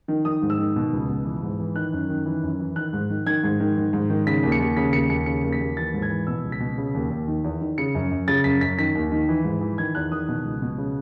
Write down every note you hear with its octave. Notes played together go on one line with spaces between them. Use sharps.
D#3
D#3 D#6
G#2
E6
D#3
B2
C#2
B2
E3
G#2
E3
D#3 F#6
F#2
D#3
E3
F#2
E3
D#3 F#6
G#2
D#3
D#3 G#6
G#2
D#3
D#3
G#2
D#3
C#3 B6
D#2
C#7
D#2
C#3 B6
D#2 C#7
D#2 C#7
C#3 C#7
D#2
B6
D#2
E3 A6
G#2
G#6
E3
B2 E6
C#2
B6
B2
C#3
D#2
D#2
D#3
E2
D#3
C#3 C#7
F#2
F#2
C#3 A6
F#2 B6
F#2 B6
D#3 B6
D#2
D#3
E3
G#2
E3
D#3 G#6
E2 F#6
D#3 D#6
B2
C#2
B2
C#3